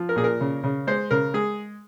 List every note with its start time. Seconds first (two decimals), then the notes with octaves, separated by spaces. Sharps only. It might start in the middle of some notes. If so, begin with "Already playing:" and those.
Already playing: F3
0.09 A#4
0.16 A#2 G#4
0.24 A#4
0.41 C#3
0.64 C#3
0.87 G#3 C5
1.11 C#3 A#4
1.34 G#3 G#4